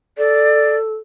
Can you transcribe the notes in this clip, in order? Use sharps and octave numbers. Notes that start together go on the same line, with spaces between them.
A4 D5